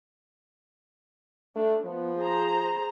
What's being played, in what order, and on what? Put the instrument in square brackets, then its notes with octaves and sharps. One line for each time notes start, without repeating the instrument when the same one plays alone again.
[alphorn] A3 [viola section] D4
[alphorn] F3 [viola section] B3
[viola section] G#4 C5 A#5